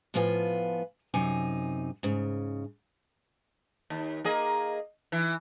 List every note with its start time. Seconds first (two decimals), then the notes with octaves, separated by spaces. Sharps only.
0.14 A2 F3 B3 F4 G#5
1.14 F#2 C3 D#4 G#5
2.03 G#2 C#3
3.90 D#2
4.24 A#3 G#4 D#5
5.12 E3